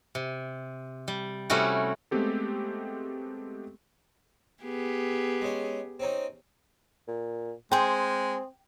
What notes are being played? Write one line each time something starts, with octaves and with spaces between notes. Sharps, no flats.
C3
G3
C3 G3 A3 C#4 E4 F#4
G#3 A3 B3 C4 G4 A4
B3 G4 G#4
G#3 C#4
C4 C#4 D#4
A#2
G#3 C4 G#4 C5 G5